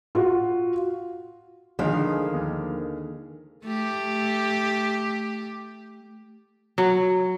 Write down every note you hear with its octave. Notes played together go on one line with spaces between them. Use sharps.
F4 F#4
A#1 D3 D#3 F3 G#3 G#4 F5
D#2
A3 G4
F#3